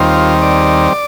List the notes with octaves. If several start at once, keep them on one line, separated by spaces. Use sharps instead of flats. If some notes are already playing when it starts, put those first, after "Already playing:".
Already playing: D#2 D#3 G3 C4 F4
D5